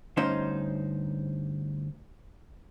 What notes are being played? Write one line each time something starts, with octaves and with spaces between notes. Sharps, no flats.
D2 G2 C#4 D#4 C5 F5